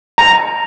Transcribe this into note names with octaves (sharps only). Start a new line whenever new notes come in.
A#5